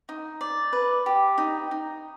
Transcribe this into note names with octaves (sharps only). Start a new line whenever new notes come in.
D#4
D5
B4
G4
D#4
D#4